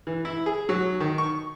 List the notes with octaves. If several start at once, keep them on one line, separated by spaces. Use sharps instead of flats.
E3
E4
G#4
F#3
D#3
C#6